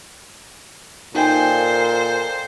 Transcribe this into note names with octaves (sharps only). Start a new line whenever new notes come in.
A#2 D#4 A4 C5 G5 G#5